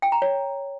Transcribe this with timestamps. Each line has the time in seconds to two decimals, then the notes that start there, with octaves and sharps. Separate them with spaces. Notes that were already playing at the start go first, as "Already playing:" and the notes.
0.02 G5
0.12 A#5
0.22 C#5